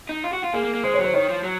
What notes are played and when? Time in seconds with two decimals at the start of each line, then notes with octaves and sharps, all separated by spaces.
0.09 D#4
0.24 F4
0.33 F#4
0.44 F4
0.54 A#3 G#4
0.64 A#3
0.74 A#3
0.83 G#3 C5
0.94 C#5
0.99 F#3
1.04 C5
1.14 D#3 C#5
1.29 F3
1.44 F#3